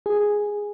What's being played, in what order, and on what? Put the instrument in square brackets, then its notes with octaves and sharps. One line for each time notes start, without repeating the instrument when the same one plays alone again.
[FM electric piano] G#4